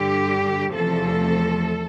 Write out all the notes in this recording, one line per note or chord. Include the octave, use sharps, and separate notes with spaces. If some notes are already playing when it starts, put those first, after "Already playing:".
Already playing: G2 D3 G3 G4
E2 C3 F3 A3 A4